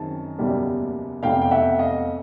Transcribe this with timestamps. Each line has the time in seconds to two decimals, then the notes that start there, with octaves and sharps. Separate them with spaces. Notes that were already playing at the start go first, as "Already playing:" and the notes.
Already playing: F#2 D#3 G#3 C4 A5
0.38 F#1 E2 B2 G3 A#3
1.23 F1 E2 C3 F5 G5
1.42 G5
1.51 E5 F#5
1.79 D#5 F5